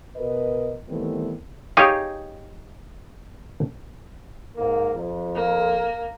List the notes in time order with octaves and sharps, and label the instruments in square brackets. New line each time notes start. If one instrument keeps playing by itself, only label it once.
[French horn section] B2 A#4 B4 D#5
D#3 E3 G3 A3 B3 C4
[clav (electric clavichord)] D#4 G4 G#4 C#5 D#5 F5
[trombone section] G#2 A#3
F2
[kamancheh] A#3